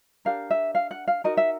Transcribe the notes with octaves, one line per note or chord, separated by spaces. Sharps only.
D4 G4 A#4 F5
E5
F5
F#5
F5
D#4 F#4 A#4 D#5
E5